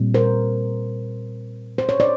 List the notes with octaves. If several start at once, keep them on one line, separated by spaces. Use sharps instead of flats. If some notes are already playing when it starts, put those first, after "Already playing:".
Already playing: A#2 G3 C4
A#4 C5
C5
C#5
C5 D5